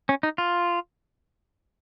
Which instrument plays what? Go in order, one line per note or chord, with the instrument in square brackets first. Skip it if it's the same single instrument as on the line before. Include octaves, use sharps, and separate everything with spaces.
[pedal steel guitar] C#4
D#4
F4